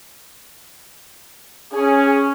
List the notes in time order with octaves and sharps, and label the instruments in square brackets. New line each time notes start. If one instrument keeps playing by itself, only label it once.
[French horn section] C#4 [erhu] G#4